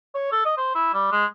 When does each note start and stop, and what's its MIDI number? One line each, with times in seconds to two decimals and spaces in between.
0.15 0.27 73
0.32 0.44 69
0.45 0.55 75
0.57 0.73 72
0.75 0.90 64
0.94 1.08 55
1.12 1.25 56